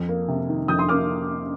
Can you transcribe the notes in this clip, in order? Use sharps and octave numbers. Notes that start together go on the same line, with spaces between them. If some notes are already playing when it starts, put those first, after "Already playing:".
Already playing: F2
A#3
C3
D#3
F2 D#6 G6
C6 D#6
A#3 D6 F6